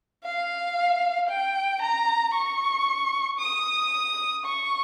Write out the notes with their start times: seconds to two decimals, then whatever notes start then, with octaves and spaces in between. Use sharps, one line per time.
0.24 F5
1.29 G5
1.82 A#5
2.34 C#6
3.40 D#6
4.45 C#6